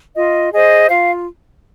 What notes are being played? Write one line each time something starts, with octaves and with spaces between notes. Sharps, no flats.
F4 D#5
G#4 C5 D#5
F4 F5